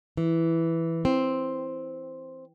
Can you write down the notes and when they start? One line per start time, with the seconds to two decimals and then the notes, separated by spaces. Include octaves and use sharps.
0.17 E3
1.05 C4